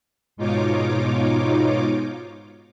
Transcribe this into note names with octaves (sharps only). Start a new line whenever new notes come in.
G#2 B2 D#4 F4 C#5 D6